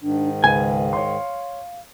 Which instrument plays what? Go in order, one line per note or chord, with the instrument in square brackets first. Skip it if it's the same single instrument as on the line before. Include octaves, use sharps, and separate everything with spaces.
[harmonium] G#2 D#3 [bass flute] D4
[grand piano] C#2 B4 D#7 [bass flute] F5 [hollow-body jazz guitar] G#5
[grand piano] C#5 C6